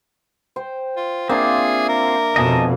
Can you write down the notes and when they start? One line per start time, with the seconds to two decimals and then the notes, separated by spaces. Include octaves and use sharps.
0.56 C5 G5
0.96 F4
1.29 A#3 C4 D4 F4 G#4 E5
1.89 A#4
2.36 F2 B2 D#5 G#5 A5